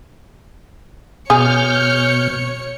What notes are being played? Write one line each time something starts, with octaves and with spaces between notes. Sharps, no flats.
B2 G#4 C#5 F6 G6 C#7